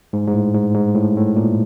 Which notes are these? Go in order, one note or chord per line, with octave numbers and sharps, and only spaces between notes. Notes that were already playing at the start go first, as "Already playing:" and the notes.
G#2
G#2
A2
G#2
G#2
A2
A2
A#2